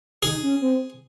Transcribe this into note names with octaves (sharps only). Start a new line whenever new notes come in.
D#4 G#4
C#4
C4